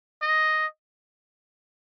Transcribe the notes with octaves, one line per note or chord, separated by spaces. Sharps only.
D#5